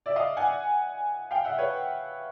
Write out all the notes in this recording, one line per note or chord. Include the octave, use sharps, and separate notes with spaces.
D5 E5
D#5 F5
F#5 G#5
F5 G5
E5 F#5
B4 C#5